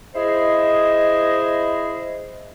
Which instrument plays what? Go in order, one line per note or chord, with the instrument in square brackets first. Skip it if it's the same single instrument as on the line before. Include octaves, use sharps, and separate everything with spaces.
[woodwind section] E4 G#4 C5 D#5